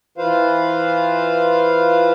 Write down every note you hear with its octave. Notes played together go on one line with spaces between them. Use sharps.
E3 F4 B4 C5 F5